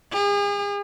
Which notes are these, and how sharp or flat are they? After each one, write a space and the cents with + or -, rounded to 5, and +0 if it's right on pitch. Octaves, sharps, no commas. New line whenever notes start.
G#4 -40